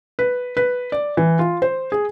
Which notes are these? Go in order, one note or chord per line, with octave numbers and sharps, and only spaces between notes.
B4
B4
D5
E3
F4
C5
G#4